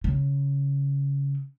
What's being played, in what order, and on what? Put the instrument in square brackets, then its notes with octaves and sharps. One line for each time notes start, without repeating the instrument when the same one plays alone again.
[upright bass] C#3